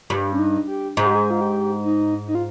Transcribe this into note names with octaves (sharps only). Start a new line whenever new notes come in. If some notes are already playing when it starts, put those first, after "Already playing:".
G2 G4
C#4
D#4
G4
G#2 G#4
G4
G#4
F4
G4
D#4
D#4
F4